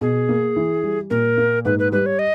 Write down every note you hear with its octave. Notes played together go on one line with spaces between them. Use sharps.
B2 G#4
A#3
E3
G3
A#2 A#4
A#3
G#2 B4
B4
G3 B4
C#5
D#5